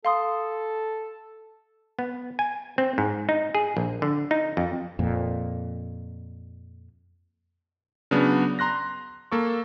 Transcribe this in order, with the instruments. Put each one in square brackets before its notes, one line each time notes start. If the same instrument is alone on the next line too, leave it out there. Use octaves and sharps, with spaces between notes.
[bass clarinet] A4 [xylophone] F5 C6 D#6
[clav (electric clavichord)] B3
G#5
C4
G#2
D#4
G#4
A#1
D3
D#4
F2
[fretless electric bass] F2 A#2
[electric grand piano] C#3 F#3 B3 D4
A#5 C6 F#6 A#6
A#3 A4 C#6